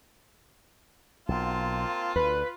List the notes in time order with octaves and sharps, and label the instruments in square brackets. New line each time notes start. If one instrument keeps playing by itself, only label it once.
[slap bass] B1 [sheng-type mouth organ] A#3 C4 A5 [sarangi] F4
[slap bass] D2 [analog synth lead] B4